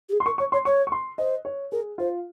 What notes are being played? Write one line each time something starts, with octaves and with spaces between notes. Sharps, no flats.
G4
G#4
C6
A#4 C#6
C#5 C#6
C#5 C6
C#5 C#6
C#6
C6
C5 D#5
C#5
G#4 A#4
F4 C5